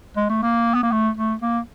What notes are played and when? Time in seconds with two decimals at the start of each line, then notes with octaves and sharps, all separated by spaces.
0.17 G#3
0.30 A3
0.42 A#3
0.74 B3
0.83 A#3
0.92 A3
1.17 A3
1.42 A#3